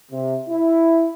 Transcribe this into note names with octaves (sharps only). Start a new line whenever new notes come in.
C3
E4